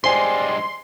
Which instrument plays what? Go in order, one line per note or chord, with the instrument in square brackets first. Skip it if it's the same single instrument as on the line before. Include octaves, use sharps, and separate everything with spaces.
[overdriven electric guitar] G2 G#3 [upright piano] C5 G#5 [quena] D5 [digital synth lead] C6